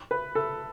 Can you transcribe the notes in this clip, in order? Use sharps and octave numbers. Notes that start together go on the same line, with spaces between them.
B4
A4